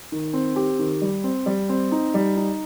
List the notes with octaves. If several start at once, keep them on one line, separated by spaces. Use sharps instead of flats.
D#3
C4
G4
D#3
G3
C4
G3
C4
D#4
G3
D#4